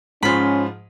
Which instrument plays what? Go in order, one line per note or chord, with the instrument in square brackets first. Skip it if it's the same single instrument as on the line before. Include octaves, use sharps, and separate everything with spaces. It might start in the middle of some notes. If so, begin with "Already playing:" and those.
[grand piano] G#2 F3 [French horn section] C#4 [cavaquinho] F4 B5